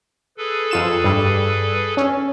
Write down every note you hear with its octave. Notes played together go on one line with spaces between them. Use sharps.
G#4 A4 B4
F2 F4 E7
G2 G3
C#4